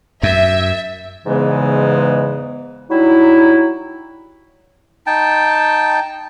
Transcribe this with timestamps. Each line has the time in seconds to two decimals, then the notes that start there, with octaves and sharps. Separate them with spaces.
0.23 F#2 E5
1.26 E2 G#2 C#3 E3 G#3 B3
2.91 F#3 G3 D#4 E4
5.07 D#4 G5 A5